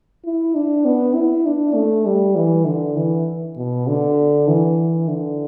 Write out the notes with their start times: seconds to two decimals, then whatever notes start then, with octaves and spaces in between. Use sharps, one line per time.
0.25 E4
0.55 D4
0.85 B3
1.15 E4
1.46 D4
1.75 A3
2.06 G3
2.36 E3
2.66 D3
2.96 E3
3.57 B2
3.87 D3
4.48 E3
5.08 D3